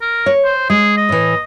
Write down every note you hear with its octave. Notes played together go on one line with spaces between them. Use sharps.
A#4
C#5
C5
G#3 G#4
D#5
A2 E3